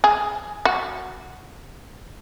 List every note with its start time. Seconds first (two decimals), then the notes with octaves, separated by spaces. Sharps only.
0.04 G#4
0.65 F#4